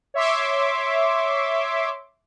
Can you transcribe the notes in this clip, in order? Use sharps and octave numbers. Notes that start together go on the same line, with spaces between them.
C#5 E5 C6 D6